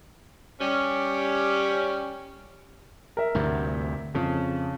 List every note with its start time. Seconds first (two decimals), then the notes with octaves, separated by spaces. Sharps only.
0.61 G3 C#4
3.17 A#4 E5
3.35 D2 G2 C3
4.15 F2 C#3